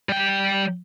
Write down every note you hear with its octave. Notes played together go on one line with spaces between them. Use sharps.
G3 G5